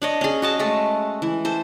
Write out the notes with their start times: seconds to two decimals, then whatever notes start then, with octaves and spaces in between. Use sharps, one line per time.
0.02 D4 C#5 D#5
0.21 C#4 G#4
0.42 F#4 D#5 A5
0.59 G#3 A3 A4
1.22 E3
1.45 A4 C5